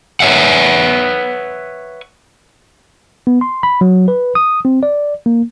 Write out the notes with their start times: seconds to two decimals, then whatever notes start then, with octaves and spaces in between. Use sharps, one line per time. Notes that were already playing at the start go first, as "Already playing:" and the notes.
0.20 B4 C#5 E5 F#5
3.27 B3
3.41 C6
3.63 B5
3.81 F#3
4.08 B4
4.35 D#6
4.65 C4
4.83 D5
5.26 A#3